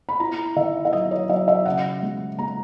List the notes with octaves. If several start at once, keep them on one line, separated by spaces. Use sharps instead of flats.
B5
E4 A#5
D#3 E5
E5
F#3 D#5
C#5
F#3 E5
E5
C#3 F#5
G#3
G#3 A#5